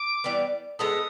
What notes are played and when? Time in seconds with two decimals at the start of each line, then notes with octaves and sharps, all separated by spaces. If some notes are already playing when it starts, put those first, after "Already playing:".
Already playing: D6
0.24 E3 G3 B3
0.79 G#3 B3 E4 A4 D#6